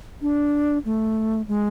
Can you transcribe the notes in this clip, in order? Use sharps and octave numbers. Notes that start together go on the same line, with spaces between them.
D4
A3
G#3